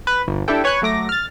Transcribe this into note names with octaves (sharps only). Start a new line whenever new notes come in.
B4
G1
D4 E4 G4 A4 G5
B4 C#5 G#5 C#6 F#6
F#3 A3 D6 A#6
F6 A6